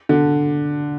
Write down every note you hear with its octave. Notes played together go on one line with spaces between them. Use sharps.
D3